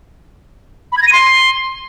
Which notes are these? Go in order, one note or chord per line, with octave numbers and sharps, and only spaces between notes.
B5
G#6
A#6
D#7
C6